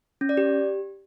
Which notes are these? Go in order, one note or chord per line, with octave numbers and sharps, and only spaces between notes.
C#4
D5
G4